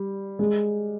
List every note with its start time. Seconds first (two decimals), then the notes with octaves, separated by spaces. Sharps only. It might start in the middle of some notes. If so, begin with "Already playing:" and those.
Already playing: G3
0.39 G#3